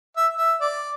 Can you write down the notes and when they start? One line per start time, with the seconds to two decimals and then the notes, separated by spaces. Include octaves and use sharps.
0.16 E5
0.37 E5
0.61 D5